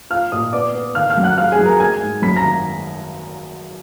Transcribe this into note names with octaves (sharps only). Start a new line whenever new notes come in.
F3 F5 F6
A#2 D#5 D#6
B3 D5 D6
B3
D#3 F5 F6
F5 F6
F#2
F#5 F#6
G#2 F5 F6
G#4 G#5
F#3
A#4 A#5
G#3 G#5 G#6
G#2
F#2 B5 B6
A#5 A#6
G#1